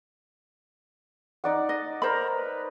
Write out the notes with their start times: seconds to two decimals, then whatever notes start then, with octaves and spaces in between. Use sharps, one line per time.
1.44 D#4 D5 F#5
1.69 D#5
2.02 A#4 C5 B5
2.35 B4